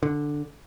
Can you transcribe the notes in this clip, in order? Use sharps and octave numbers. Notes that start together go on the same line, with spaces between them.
D3